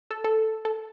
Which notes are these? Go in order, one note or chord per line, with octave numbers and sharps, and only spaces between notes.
A4
A4
A4